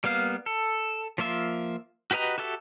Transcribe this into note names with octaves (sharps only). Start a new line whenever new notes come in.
G3 A#3 B3 F5
A4
F3 A#3 F4 E5
F#4 G4 B4 D#5 A#5
F#4 G4 A4 E5